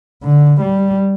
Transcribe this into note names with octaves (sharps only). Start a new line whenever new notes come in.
D3
G3